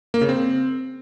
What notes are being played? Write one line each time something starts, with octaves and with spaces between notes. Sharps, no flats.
A#3
C#3
C4